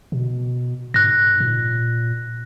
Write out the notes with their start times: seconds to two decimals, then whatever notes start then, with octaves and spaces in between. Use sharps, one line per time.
0.12 B2
0.94 G#2 F#6 A#6
1.40 A#2